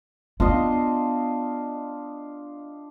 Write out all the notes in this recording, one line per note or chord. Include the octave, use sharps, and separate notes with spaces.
B3 D4 F4 D#5